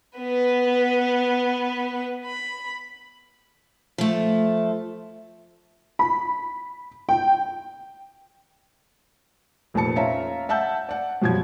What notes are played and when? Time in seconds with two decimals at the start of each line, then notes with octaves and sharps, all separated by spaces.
0.18 B3 B4
2.25 B5
3.98 F3 A3
5.99 B5
7.09 G5
9.74 F1 F2 A#2 A5 C#7
9.96 C#4 F4 E5 A#5
10.49 E5 F#5 A5 E6 G6
10.89 D5 F#5
11.22 F#2 B2 F3 G3 G#6